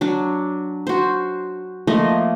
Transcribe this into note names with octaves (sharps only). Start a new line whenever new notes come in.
F#3 D4
F#4 C5
F3 A3 A#3 D#5